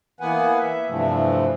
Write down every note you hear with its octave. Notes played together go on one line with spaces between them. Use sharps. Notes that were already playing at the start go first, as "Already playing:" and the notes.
E3 A#3 B3 B4 F#5 G#5
E5
G2 C3 E3 F3 A3